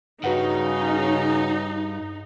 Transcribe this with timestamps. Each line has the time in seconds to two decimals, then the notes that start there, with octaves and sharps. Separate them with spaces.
0.24 G2 C#3 D#4 F#4 B4 F#5